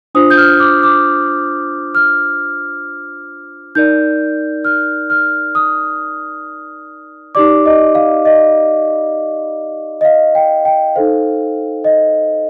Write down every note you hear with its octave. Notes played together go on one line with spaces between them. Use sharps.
D4 F4 C5 D#6
G6
F6
D6
D6
F6
D#4 A#4 D5 G6
F6
F6
D#6
D#4 G4 D5 D6
D#5
F5
D#5
D#5
F5
G5
G5
D#4 A4 C5 F5
D#5